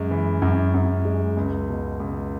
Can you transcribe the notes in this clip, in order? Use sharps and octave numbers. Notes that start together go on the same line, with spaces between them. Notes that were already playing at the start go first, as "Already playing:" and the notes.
Already playing: F#2 G#3
E3
F#2
F#2
G#3
C#2
B2
C#2